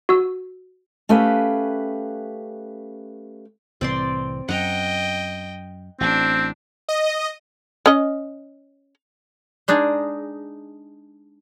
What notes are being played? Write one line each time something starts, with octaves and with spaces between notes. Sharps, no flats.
F#4 E6
A3 C#4 G4 B4 F5
C2 A2 E3 C4 D5 C6
F#2 D#5 F#5 G5 A#5
A1 C4 D4
D#5
C#4 D#5
G#3 D4 D#4 G#4